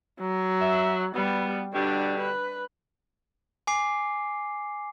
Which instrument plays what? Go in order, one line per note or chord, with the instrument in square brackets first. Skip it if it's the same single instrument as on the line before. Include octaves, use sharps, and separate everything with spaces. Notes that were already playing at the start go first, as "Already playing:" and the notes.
[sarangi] F#3
[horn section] E5
[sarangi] G3 [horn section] B3
[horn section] B2 D3 G3 [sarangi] D4
[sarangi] B4
[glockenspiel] G#5 D6 C7